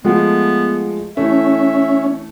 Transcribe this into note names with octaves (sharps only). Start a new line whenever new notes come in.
F3 G#3 A3 B3
E3 A3 C#4 E5